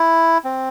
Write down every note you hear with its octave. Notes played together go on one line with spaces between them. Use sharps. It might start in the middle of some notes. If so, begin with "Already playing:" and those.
Already playing: E4
C4